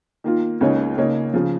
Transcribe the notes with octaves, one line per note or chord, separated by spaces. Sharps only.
D#3 A#3 F4
C#2 C#3 A#3 D#4 C#5
C#3 A#3 D#4 C#5
C#3 F3